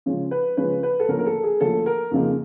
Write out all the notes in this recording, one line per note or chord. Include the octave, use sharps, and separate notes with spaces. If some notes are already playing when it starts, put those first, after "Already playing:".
C#3 F3 G#3 C#4
B4
C#3 F3 G#3 C#4 B4
B4
A4
D2 D3 F3 A#3 C#4 A#4
A#4
A4
G#4
D2 D3 F3 A#3 C#4 A4
A#4
F2 C#3 F3 A#3 D#4